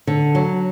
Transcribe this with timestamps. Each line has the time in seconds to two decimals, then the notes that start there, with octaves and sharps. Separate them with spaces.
0.07 D3
0.35 F#3